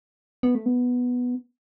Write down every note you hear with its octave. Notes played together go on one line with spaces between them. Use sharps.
B3
A3
B3